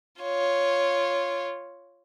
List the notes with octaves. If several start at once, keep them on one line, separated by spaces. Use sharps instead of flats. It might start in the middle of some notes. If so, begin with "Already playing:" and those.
F4 C#5